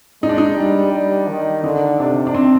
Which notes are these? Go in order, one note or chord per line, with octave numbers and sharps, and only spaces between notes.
G#3 D#4
D4
D#4
G3
G3
D#3
D3 D#4
C3 D4
D4
C4